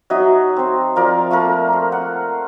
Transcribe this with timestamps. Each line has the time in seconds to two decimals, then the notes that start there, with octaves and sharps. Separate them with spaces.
0.10 F#3 D#4 E5 D#6
0.56 C4 C5
0.96 F3 A#4 D5
1.31 A3 A#3 A4 A#4
1.73 C5
1.92 F#5